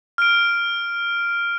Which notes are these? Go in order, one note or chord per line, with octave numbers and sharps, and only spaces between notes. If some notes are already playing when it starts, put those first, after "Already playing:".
F6 D7